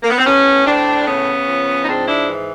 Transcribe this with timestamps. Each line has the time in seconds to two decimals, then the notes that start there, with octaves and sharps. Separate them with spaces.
0.02 A#3
0.10 B3
0.18 C4
0.25 A2 B3 C#4
0.65 A2 C4 D4
1.06 C#3 B3 C#4
1.46 F3
1.82 D#4
1.86 G#2 C4 D4
2.06 D4 E4
2.27 E3